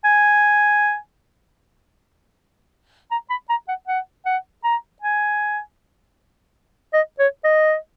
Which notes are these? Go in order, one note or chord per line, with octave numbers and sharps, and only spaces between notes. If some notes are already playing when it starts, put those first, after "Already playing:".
G#5
A#5
B5
A#5
F#5
F#5
F#5
A#5
G#5
D#5
C#5
D#5